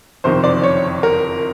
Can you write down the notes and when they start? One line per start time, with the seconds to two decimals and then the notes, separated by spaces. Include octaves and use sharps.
0.24 F#1 F2 C3 D#3 C5
0.44 D5
0.64 C#5
1.03 A#4